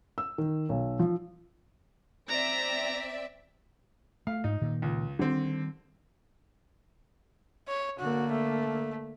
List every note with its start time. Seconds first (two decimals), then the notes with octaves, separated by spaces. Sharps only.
0.18 E6
0.38 D#3
0.69 B1
0.99 F3
2.29 C4 D5 E5 A#5
4.27 A3 F5
4.44 G#2 D#4
4.61 A#2 D#3 A#3
4.82 C#2
5.19 D3 D#3 G3 C4
7.68 C#5
7.99 D3 A#3 F#4
8.31 A3